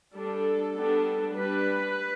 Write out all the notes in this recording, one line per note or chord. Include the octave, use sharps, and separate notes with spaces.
G3 D4 A4
G3 B3 D4
G3 D4 B4